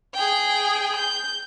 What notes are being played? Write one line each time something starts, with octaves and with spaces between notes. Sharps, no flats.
G#4 G5
G6